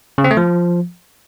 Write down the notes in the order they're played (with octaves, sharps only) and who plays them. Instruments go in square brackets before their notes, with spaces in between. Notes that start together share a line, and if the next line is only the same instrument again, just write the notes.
[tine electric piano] C#3
C4
A3
F3